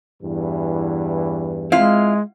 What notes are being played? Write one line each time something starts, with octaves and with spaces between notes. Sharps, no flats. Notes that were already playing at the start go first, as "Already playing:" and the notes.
E2 G2 E3
G#3 C4 E4 F4 F5